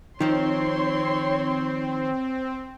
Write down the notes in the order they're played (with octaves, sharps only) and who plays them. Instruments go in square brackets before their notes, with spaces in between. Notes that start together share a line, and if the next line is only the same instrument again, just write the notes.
[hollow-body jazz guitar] D#3 F3 [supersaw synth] C4 [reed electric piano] D#4 [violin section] C#5 C6